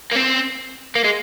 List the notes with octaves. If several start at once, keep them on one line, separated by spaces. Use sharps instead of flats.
A#3
C4
A#3
G#3